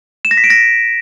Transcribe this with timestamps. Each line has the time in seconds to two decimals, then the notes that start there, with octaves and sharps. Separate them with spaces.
0.25 E7
0.31 A#6
0.37 B6
0.44 D7
0.50 A#6